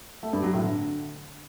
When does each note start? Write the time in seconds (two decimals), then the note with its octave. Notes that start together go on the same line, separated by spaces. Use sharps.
0.23 A3
0.33 G2
0.43 F#3
0.53 A2
0.64 D3